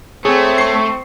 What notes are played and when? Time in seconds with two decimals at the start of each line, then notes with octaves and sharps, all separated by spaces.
0.25 A3 C4 G#4 C#5
0.58 C#6 C7